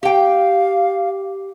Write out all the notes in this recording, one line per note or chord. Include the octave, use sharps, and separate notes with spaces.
G4 F5 G5